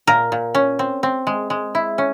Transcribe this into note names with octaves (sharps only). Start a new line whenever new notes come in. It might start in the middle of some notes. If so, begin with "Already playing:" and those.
A#2 A#4
A#2
C#4
C4
C4
G#3
G#3
E4
C#4